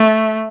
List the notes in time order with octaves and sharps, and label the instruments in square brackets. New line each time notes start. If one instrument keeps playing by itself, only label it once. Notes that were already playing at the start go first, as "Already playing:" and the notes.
Already playing: [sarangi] A3